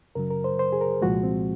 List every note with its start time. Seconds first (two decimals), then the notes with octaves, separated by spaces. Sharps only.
0.15 F#2 C#3 F#3 A#4
0.30 A#4
0.44 C5
0.59 C5
0.73 G#4
0.81 A#4
1.02 C2 A#2 F3 G#3 F#4
1.23 C4